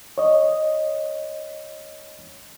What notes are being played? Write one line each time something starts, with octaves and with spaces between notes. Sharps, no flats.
C#5 D#5